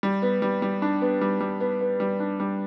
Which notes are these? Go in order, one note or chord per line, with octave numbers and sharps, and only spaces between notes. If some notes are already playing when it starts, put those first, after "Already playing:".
G3
B3
G3
G3
D4
B3
G3
G3
B3
B3
G3
D4
G3